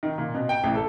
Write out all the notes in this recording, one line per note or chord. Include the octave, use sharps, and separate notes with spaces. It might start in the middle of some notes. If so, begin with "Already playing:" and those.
D#3
A#2
B2
G5
A1
A4